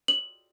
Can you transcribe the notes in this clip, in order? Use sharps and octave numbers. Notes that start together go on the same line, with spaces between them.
F#7